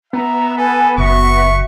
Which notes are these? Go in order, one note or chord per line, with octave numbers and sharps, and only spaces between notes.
B3 E5 A#5
A4 B4 G#5
F#1 F#4 E5 C#6